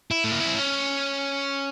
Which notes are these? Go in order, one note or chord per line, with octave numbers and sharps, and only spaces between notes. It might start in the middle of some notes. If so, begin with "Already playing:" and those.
E4
A3
A#3
B3
C4
C#4